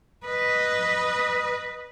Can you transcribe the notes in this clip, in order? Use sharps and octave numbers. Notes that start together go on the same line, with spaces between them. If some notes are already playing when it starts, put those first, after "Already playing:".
B4 D#5